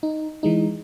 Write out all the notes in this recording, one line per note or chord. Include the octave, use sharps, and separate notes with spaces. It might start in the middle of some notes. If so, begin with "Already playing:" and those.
D#4
E3 G#3 D#4